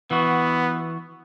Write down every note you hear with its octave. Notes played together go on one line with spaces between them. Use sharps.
E3 B3 F#4